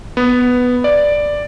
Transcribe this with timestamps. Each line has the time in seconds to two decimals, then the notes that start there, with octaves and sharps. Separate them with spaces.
0.17 B3
0.84 D5